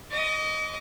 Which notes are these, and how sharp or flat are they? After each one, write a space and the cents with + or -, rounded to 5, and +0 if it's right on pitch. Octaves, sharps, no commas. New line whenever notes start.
D#5 +0 D6 -40